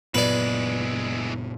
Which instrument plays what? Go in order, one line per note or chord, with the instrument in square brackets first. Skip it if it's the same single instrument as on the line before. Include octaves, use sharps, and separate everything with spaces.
[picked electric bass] F#1 F#3 B3 [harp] A#2 [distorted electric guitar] E3 G#3 [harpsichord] B4 D5